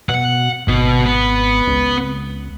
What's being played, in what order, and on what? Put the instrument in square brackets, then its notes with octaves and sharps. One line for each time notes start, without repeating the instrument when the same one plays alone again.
[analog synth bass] B2 [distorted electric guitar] F#5
[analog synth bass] G#1 [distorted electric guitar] B2 D#5
[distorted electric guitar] B3
[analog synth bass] C#2